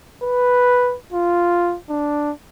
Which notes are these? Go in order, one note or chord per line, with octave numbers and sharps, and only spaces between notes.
B4
F4
D4